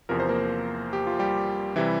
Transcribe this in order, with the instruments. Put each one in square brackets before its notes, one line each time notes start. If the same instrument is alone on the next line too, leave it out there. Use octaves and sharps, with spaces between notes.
[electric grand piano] E2 C3 F3 A#4
C5
A#3 A#4
G4
F4
G3 G4
C3 E3 G3 E4